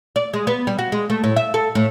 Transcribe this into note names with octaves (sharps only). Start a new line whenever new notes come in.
D5
G#3
B3
G3
F#4
G#3
A3
A2
E5
A4
A2